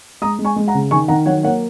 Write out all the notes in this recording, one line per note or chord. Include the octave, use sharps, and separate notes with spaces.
G#3 A#5 D#6
G#3
G#5 C#6
G#3
F#5 A#5
C#3
D#3 G#5 C#6
D#3 F#5 A#5
F#3 C#5 F#5
A#3 C#5 F#5